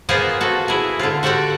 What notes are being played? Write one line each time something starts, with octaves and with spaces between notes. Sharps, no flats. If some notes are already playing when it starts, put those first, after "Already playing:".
A#3 B3 F4 G#4 C5 D#5
F#4 A4
E4 G#4
D3 F4
F#4 G4 A4 D5 F#5